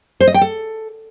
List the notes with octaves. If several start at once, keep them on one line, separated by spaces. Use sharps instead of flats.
C5
D#5
G5
A4